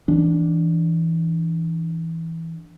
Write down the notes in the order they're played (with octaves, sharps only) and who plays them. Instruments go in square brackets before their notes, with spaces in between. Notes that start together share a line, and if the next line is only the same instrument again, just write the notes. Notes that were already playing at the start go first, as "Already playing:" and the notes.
[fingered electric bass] E3 D4